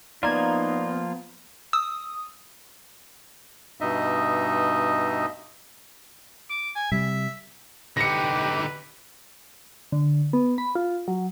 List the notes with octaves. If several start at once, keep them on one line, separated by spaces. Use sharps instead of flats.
F3 A#3 B3 D#4 F4 D5 A#5 G#6
D#6 E6
G2 B2 D#4 D#5 E5
D6
G#5
C3 G3 E5
D3 D#4 G4 B4 A#6 C#7
D3
B3
B5
F4
F#3